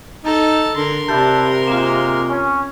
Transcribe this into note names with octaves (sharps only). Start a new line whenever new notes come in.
D#4 A4 A5
D3 A#4 C6
C3 D4 E4 G4 A5
G#3 A#3 C4 F4
C#4